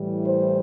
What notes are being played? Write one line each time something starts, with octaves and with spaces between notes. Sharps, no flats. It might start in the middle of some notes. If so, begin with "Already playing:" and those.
Already playing: A2 E3 G3
C5